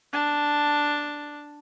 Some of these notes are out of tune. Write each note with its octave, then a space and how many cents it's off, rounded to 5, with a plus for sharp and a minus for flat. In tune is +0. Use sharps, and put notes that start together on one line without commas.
D4 +0 A5 +5